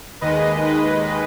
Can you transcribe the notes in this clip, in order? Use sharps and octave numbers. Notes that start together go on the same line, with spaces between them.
D#2 D#3 G#3 B4 D#5
B4 D#5